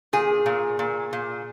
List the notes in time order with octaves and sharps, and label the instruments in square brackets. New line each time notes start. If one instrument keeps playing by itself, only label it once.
[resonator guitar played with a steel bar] A#2 G#4
A#2
A#2
A#2